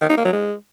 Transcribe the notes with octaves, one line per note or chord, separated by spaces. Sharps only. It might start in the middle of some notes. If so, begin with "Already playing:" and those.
D#3
D#4
A#3
F#3
G#3